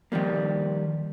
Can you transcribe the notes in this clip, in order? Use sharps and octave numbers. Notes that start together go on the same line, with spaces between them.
D#3 F3 G3 A#3